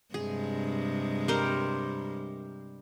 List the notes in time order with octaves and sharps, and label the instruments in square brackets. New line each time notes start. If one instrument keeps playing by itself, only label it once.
[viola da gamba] G2 C3 G#3 [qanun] G#4
[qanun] G3 A#4 C5